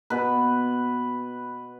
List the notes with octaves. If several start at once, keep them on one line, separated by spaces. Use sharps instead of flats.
B2 B4